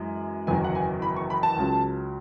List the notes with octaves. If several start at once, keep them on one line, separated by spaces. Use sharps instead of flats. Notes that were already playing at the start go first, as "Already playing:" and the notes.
Already playing: F#2 E3 G#3
F#1 E2 D#3 F#3 G#5
F#5
G#5
B5
C#6
B5
A5
C#2 C#3 F#3